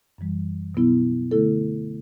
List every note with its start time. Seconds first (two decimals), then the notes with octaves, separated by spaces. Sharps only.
0.18 F#2 E3 G3
0.75 B2 F#3 B3 E4
1.31 D3 A3 E4 A4